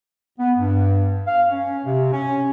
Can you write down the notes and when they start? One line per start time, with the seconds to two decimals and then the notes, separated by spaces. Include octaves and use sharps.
0.38 B3
0.57 G2
1.27 F5
1.49 C#4
1.84 C3
2.12 C#4